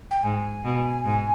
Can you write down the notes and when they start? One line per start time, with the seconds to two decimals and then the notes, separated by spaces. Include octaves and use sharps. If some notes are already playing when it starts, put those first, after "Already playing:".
0.11 G5
0.23 G#2 G#5
0.64 B2
1.04 G#2